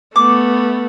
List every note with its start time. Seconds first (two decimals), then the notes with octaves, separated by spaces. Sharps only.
0.16 A3 B3 D6